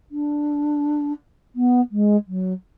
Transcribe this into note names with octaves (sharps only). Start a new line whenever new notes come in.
D4
B3
G#3
F#3